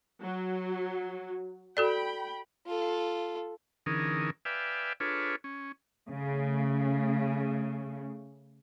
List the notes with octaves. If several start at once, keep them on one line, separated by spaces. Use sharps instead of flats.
F#3
F#4 A4 D5 G5 B5
F4 A4
D3 E3 C#4 D#4 G#4 A#4
B4 D5 E5 F5 G5 G#5
D4 F4 G#4 A4 B4 C#5
C#4
C#3 A3